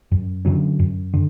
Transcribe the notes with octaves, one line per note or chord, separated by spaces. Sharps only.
F#2
D3 F#3 C#4
F#2
D3